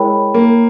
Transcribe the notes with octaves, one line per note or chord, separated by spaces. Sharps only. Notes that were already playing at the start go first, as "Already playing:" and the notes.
Already playing: G#3 E4 A#4 C#5 G5 B5
A#3